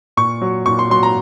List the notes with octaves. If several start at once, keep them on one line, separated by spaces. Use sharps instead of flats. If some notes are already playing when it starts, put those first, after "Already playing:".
A#2 C#6
F#3
A#2 C#6
C6
F#3 C6
A#5